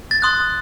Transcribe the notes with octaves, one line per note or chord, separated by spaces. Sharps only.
A6
C6 D#6 F#6